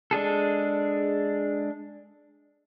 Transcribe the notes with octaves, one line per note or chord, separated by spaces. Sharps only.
G#3 D4 G#4 A4